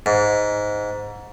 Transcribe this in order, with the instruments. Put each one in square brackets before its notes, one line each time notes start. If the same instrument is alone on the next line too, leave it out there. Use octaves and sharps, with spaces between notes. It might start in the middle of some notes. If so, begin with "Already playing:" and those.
[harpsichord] G#2